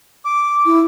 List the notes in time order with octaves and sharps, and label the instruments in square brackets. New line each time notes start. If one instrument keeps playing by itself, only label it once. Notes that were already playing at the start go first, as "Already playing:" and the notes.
[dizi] D6
[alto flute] E4